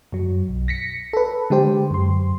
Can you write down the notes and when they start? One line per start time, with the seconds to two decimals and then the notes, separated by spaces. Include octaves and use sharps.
0.12 F#2 F#3
0.48 B1
0.68 A#6 B6 C#7
1.13 A4 B4
1.50 D3 G#3 G4 C5
1.91 F#2 C6